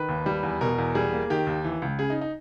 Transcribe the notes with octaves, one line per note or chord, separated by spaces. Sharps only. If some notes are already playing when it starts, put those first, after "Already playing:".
Already playing: D#3 B4
D#2
G3
E2
B2 A#4
E2
G3 G#4
A#3
D#3 G4
D#2
E3
C#2
C#3 G#4
D#4
D#4